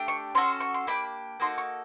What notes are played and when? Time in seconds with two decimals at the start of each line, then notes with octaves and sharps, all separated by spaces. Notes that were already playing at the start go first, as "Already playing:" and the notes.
Already playing: A3 D4 G4
0.08 C#6
0.35 C#4 F#4 A4 C6
0.60 C#6
0.74 C6
0.87 A#3 D4 G4 B5
1.40 A#3 D#4 F#4 A4 C6
1.58 C#6